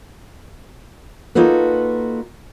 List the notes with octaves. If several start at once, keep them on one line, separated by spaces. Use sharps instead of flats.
A#3 D#4 F4 F#4 A4 B4